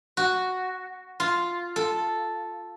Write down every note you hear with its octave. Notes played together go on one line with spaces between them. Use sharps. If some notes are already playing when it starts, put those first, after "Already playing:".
F#4
F4
A4